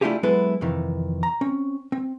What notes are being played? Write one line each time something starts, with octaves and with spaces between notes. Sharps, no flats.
A3 D4 E4 F4 G4 G#4
F#3 G#3 B3 E4 A4 B4
F2 C3 D#3 E3
A#5
C4 C#4
C4